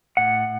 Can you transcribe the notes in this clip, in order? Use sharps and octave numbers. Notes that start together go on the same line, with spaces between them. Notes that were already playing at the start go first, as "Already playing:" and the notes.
A2 F#5